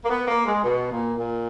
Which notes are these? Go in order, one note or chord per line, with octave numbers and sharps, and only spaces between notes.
A#3
B3
A#3
G#3
B2
A#2
A#2